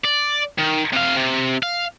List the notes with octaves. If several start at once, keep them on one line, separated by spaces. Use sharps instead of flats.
D5
D#3
C3 F5
C3
F5